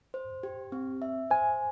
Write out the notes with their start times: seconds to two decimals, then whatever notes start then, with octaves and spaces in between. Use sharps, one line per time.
0.14 C5
0.43 G4
0.72 C4
1.02 E5
1.31 C5 G#5